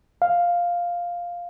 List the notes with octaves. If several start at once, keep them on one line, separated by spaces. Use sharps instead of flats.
F5